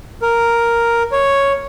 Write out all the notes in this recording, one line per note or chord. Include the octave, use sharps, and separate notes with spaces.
A#4
C#5